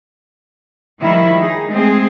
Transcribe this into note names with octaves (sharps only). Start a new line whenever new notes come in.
D#3 F3 G3 E4
D#4 G#4
G#3 A3 C4 G#4